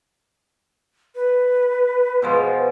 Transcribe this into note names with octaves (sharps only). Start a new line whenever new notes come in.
B4
B2 F3 G#3